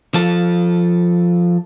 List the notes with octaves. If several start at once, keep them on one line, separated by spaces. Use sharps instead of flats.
F3 A4